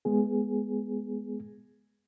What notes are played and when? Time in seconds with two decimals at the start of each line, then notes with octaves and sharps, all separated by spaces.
0.05 G#3 B3 G#4